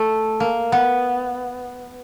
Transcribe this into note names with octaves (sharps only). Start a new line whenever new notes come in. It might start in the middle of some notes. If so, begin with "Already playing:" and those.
Already playing: A3
A#3
B3